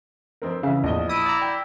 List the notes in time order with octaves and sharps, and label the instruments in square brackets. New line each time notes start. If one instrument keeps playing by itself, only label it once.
[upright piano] F2 C4 A#4
[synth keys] C#3 E3 [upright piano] E4 E5 F5
[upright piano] A#1 D#5 G7 [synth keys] E2 A2
[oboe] E4 [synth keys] D#6 D7
[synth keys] D5 A#5
[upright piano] G5